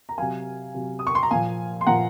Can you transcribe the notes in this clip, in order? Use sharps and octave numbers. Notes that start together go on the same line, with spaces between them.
A#5
C3 F#3 F5 G#5
C3 F#3
D#6
C#6
C6
A#5
A#2 F3 F5 G#5
C6
A#2 F3 F#5 A#5